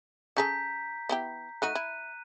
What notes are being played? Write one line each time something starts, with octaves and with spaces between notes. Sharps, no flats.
C#4 G#4 A4 A#5 G6 B6
B3 E4 G4
A3 D#4 F#4 F#6 D#7
E4